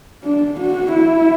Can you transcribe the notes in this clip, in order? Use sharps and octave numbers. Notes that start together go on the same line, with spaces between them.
D4
F#4
E4